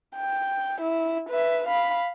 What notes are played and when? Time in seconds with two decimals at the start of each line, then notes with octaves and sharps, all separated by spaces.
0.16 G5
0.81 E4
1.29 B4 E5
1.67 F5 B5